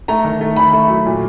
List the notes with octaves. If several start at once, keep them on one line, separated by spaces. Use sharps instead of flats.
A3 A#5
D#3
A3
D#3 B5
A3
F#3
A#2